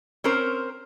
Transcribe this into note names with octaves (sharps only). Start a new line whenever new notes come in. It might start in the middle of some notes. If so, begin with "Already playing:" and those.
C4 C#4 A#4 C5